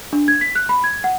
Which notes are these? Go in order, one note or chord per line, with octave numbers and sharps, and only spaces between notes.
D4
G#6
B6
F#6
B5
G#6
F#5